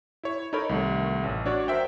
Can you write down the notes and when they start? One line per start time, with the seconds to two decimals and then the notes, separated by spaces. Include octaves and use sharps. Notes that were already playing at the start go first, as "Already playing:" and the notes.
0.23 E4 C#5
0.53 D#4 A4 A#4 C#5 B5
0.69 C2 D#3 A3
1.24 A1
1.46 D4 F#4 C#5 D5
1.68 A#4 C5 E5 G5